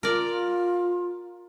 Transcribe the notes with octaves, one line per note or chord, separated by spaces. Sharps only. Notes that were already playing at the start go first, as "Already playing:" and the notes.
F4 A#4 D5